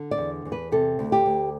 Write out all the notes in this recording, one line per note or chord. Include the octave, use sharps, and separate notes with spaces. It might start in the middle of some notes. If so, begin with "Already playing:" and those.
Already playing: D3
D5
E2
E2
B4
C3 A4
D2
G4
D2